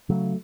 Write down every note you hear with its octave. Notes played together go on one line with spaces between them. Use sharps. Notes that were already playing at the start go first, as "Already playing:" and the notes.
C#3 F#3 A3